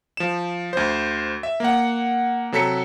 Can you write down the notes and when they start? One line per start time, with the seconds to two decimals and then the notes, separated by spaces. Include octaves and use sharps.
0.17 F3 E7
0.73 D2 C5
1.43 E5
1.60 A#3 F#5
2.52 C3 F#3 A4 A#5 B6 C#7